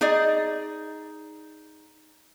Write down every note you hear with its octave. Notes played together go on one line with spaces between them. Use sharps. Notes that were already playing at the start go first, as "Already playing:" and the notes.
D#4 G#4 D5 D#5